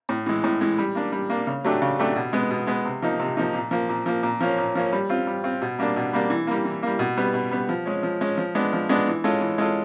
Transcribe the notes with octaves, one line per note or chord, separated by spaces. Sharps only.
A2
E3 G#3
A2
E3 G#3
G3
A#3 D4
G3
A#3 D4
C#3
F#3 A3 D4 G4
C#3
F#3 A3 D4 G4
B2
G#3 B3
B2
G#3 B3
C3
F3 A#3 D#4
C3
F3 A#3 D#4
A#2
F3 A#3
A#2
F3 A#3
A#2
F3 A#3 C#4
A#2
F3 A#3 C#4
G3
C4 F4
G3
C4 F4
B2
G3 A#3 D4
B2
G3 A#3 D4
E3
G3 A#3
E3
G3 A#3
B2
G3 B3
B2
G3 B3
F3
G#3 C#4
F3
G#3 C#4
F3
G#3 B3 D4
F3
G#3 B3 D4
E3
G#3 C#4 F4 A4
E3
G#3 C#4 F4 A4